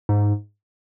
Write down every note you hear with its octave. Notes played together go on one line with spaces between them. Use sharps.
G#2